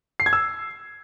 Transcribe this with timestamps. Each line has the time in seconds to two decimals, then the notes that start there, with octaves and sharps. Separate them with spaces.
0.20 C7
0.26 G#6
0.33 E6